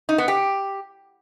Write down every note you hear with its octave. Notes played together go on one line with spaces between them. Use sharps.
D#4
B3
G4